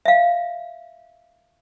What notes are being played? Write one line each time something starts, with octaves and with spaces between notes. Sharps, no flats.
E5 F5